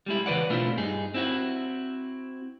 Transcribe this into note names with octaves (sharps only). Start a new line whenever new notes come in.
G3 G#3 E4
C#3 E3 B4 D5 F#5
B2 A3 C4 D4 E4 F4
G2 D#4 G#4
C4 E4 F#4